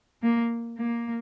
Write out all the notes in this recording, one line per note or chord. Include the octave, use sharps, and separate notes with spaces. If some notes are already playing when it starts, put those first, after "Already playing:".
A#3
A#3